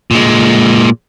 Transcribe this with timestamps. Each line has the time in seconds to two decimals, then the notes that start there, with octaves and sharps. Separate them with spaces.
0.11 A#2 G#3